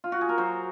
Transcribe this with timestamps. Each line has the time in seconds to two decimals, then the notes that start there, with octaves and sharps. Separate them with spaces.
0.04 F4
0.12 F#4
0.21 G#4
0.29 A#4
0.38 F#3 C5